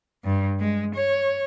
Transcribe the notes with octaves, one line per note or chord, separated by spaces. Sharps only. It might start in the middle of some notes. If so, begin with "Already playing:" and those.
G2
G#3
C#5